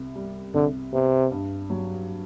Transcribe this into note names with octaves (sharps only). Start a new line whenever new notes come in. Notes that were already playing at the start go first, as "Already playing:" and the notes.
Already playing: C2
G3
C2 D3
C3 B3
G2
F#3